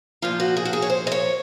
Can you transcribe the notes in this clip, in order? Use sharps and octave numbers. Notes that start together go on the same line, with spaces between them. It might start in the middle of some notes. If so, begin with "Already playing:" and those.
A#2 F3 F4
F#4
G#4
F#4
G#4
C#5
C5
D#5
C#5